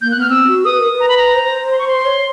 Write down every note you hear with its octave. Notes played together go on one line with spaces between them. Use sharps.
A#3 G6
F#6
B3 F6
C4 E6
F#4
B4 D#6
A#4
B4
A#5
B5
A#5
C5
C6
C#6
C6
C#5